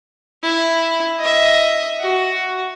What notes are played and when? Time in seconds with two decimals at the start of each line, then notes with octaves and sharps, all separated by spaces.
0.43 E4
1.20 D#5 E5
2.00 F#4